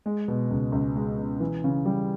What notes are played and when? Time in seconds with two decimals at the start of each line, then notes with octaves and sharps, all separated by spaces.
0.06 G#3
0.28 B2
0.51 C#2
0.72 C#2
0.96 G#3
1.18 B2
1.40 E3
1.64 C#3
1.86 G3